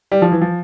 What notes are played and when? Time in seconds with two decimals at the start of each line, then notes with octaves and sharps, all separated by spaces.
0.12 G3
0.22 F3
0.32 E3
0.41 F3